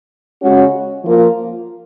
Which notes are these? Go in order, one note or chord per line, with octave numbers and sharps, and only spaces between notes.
C#3 G#3 C#4 F#4
F3 A#3 F4